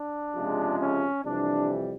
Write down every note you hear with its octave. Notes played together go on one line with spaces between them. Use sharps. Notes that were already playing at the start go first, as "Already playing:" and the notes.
Already playing: D4
C#2 C3 F3 G#3
C#4
F2 C3 E3 G3 D4